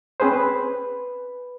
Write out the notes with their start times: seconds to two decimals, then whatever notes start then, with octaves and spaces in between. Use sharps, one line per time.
0.20 C4 C#4 G#4 B4 C5
0.33 B4